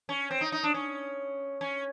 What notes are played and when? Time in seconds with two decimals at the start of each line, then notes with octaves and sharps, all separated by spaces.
0.09 C#4
0.31 C4
0.41 D#4
0.52 D#4
0.63 D4
0.74 C#4
1.61 C#4